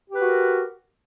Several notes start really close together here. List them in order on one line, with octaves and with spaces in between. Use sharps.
G4 B4 F#4 A#4